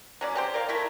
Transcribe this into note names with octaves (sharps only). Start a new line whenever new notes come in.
F#3 C#4 D5
C4 G4 C5
A#4 D5 F5
A3 E4 A#4 E5